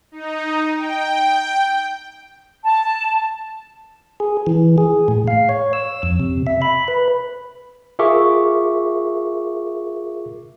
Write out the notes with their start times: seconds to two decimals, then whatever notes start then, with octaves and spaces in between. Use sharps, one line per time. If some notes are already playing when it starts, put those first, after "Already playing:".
0.12 D#4
0.76 G5
2.65 A5
4.20 G#4
4.47 E3
4.78 G#4
5.08 A2
5.28 F5
5.49 C#5
5.73 E6
6.03 F2
6.20 C3
6.47 E5
6.62 B5
6.88 B4
7.99 F4 G#4 A#4 E5 C#6 D6